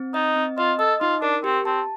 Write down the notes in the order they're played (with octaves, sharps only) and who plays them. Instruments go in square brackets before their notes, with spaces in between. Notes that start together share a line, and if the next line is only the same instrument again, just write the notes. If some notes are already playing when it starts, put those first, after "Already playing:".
Already playing: [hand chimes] C4
[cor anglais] D#4 [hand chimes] D#5
[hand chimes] C4
[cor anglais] F4 [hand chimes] D#5
[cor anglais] A4 [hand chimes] D#5
[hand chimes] D#4 [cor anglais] F4
[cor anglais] D4 [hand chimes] A#4
[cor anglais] C4 [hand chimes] G4
[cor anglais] C4 [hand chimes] A5